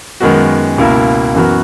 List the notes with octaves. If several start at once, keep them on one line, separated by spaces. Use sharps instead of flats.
F#2 D#3 G#3 B3 F#4
C#2 B2 A#3 E4 A#4
F#2 E3 B3 F#4 A#4